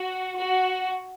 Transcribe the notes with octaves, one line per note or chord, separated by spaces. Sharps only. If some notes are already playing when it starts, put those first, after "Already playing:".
Already playing: F#4
F#4